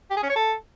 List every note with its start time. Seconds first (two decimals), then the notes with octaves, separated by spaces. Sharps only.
0.10 G4
0.17 G#4
0.23 C#4
0.29 C#5
0.36 A4